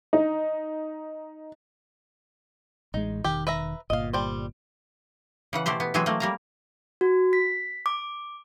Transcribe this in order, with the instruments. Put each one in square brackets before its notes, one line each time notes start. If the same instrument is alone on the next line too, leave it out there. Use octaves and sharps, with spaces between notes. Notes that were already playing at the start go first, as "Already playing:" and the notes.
[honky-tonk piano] D#4
[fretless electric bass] A1 G#3 [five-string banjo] D#4
[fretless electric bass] E1 D#3 [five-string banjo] G4
[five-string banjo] B4 E5 A#5
[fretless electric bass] G1 A#2 [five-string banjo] D#5 F5
[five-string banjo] G3 C5
[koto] C#3 E3 F#5
B2 A3 G4 C5
B3
E3 F#3 G#3 C4 G#4
A3 A#3
G3 A#3 A#5
[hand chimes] F#4
B6
D6